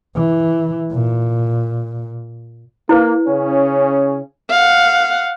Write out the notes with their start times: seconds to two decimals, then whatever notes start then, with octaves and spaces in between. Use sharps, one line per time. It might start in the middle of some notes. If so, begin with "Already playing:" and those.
0.16 E3
0.92 A#2
2.89 A#3 E4 B4
3.27 C#3 C#4
4.50 F5 F#5